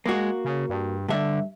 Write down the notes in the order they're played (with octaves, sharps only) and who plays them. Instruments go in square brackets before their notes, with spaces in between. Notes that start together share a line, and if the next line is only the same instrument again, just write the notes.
[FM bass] G#3 [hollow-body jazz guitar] A#3 F#4
[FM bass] C#3
G2
[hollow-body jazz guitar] G2 E5 [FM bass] D3